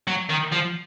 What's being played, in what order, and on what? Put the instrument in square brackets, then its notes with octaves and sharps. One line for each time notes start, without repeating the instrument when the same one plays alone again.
[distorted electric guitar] F#3
D#3
F3